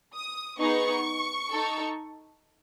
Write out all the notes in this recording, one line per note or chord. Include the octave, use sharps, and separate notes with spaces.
D#6
B3 D#4 G#4 C#6
D#4 A4